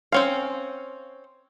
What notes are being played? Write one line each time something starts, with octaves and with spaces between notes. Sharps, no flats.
C4 C#4 F5